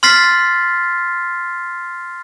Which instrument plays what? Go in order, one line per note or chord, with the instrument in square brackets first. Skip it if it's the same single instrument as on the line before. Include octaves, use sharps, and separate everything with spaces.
[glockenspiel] C6 F6 A6 B6 C7